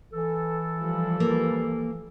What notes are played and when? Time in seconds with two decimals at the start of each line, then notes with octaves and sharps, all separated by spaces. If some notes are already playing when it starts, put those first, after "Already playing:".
0.13 E3 A4
0.79 F3 G3
1.20 A#3